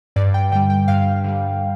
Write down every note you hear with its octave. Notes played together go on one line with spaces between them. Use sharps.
G2 D5
G5
D3 G3 G5
G5
G2 F5
D3 G3